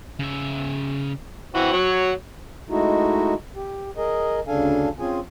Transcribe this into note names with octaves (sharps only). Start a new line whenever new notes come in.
C#3 E5
E3 C4 F#4 F#5
F#3 C#5
G#3 A3 D#4 E4 F#4
G4
G#4 A#4 D#5
D2 C#3 D4 A4 F5 G#5
C4 C#4 F4 G#4 G#5